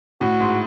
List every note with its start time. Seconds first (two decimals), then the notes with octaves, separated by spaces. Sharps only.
0.21 A2 F#4
0.40 G#2